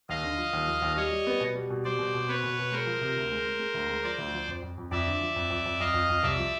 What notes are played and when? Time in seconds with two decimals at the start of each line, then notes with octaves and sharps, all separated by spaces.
0.09 D#2 D#5 F5
0.24 D3
0.38 F3
0.53 D#2
0.67 F3
0.82 D#2
0.97 G3 C#5 D#5
1.12 G3
1.27 B3
1.40 B2
1.55 G3
1.70 B2
1.85 G3 C5 D5
1.99 B2
2.14 B2
2.29 B3 B4 C#5
2.44 B2
2.58 B2
2.72 G#3 A#4 C5
2.86 F3
3.01 C3
3.16 D2
3.32 G#3
3.46 G#3
3.60 G#3
3.74 D2
3.89 G#3
4.04 F3 C5 D5
4.18 D2
4.33 F3
4.47 F2
4.62 F2
4.78 F2
4.91 F2 D5 E5
5.07 D3
5.21 F3
5.36 F2
5.50 F2
5.66 F2
5.80 F2 D#5 F5
5.94 F2
6.10 F2
6.23 C2 D5 E5
6.38 F3